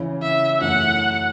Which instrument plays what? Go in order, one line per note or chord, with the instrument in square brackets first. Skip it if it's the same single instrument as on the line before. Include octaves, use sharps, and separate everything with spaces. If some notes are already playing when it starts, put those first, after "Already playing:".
Already playing: [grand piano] C#3 E3 C#4
[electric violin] E5
[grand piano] F#2 E3 A3 C#4 [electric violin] F#5